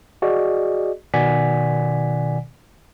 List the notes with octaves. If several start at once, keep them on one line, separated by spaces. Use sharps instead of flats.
F#4 G#4 D5 D#5
B2 D#3 D5 F#5 G#5 B6